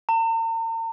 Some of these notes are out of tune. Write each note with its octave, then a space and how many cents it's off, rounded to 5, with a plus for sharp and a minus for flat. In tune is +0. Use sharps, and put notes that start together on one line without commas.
A#5 -45